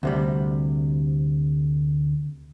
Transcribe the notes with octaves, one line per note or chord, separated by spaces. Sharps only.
D2 C3 G3